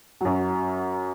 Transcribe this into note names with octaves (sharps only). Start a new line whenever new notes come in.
F#2 F#3